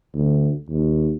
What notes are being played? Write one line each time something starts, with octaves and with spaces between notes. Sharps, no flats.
D2
D#2